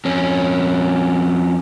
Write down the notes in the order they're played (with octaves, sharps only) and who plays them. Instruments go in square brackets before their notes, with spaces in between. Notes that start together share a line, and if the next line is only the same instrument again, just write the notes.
[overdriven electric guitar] F2 C#4